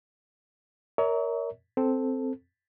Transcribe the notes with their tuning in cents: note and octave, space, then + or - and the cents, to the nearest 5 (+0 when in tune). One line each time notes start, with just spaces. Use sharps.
A#4 +0 C#5 +30 E5 -45
C4 +0 A4 +0